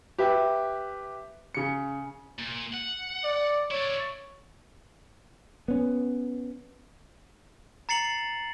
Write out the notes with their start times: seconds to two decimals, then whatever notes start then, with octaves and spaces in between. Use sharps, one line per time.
0.19 G4 B4 E5
1.55 C#3 C#7
2.39 A#2
2.74 F#5
3.24 D5
3.71 E4 C#5 D5
5.68 B3 C#4
7.89 A#5 A6 C7 C#7 F#7